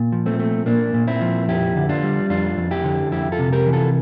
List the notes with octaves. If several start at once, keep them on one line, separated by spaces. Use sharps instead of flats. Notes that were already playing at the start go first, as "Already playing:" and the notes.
Already playing: A#2
F3
A3 C4
A3
A#2 A#3 D4
A#2
C4 E4
F3
F2 E4 G4
D3
D4 F4
G3
F2 D4 F4
F2
E4 G4
D3
F2 E4 G4
F4 A4
C3
G4 A#4
E3
F4 A4